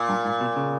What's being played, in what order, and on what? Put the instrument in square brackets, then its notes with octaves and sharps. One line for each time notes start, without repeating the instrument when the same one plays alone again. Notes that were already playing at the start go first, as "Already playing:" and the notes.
Already playing: [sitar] A#2
[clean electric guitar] G2
G#2
B2
C#3